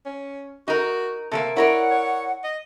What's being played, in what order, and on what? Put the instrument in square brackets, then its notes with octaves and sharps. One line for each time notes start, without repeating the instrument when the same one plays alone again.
[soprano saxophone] C#4
[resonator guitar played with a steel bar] D#4 A#4 [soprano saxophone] F#4
[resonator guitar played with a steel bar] C3 G#3 A#3 [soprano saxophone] A4
[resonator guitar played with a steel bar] E4 A#4 D5 [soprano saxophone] C#5 [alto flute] F#5
[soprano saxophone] C#5
D#5